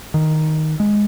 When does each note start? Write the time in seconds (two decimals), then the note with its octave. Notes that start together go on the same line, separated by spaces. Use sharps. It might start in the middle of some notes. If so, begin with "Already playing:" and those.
0.14 D#3
0.80 G#3